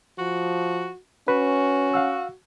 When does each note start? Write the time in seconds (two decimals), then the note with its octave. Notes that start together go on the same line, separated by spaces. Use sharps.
0.19 F3 F#4
1.28 C#4 F#4 B4
1.94 F5 F#5 E6